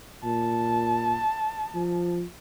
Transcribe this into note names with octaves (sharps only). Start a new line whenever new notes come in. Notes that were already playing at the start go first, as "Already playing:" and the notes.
A#2 A5
F3